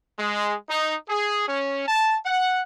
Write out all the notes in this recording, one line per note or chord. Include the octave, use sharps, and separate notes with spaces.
G#3
D#4
G#4
C#4
A5
F#5